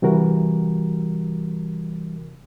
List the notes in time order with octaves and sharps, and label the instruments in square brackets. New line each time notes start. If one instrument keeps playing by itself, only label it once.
[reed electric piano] C3 E3 G3 F#4 A#4